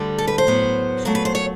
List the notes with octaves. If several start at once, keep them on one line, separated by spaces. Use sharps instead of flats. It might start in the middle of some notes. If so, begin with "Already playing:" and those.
Already playing: D2 D3 G3
A4
B4
C5
A2 F#3 B3
A#2 F#3 A3 A#4
B4
C5
C#5